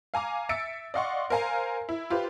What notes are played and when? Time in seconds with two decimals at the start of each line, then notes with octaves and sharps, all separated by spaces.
0.14 F5 G#5 A#5 D6
0.49 E5 E6 A6 C#7 D7
0.94 D5 D#5 F5 F#5 C6 C#6
1.30 A#4 C5 F5 G#5 A#5
1.89 E4
2.10 F4 G4 B4 C5